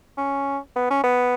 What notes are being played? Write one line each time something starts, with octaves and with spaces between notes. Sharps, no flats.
C#4
B3
C#4
B3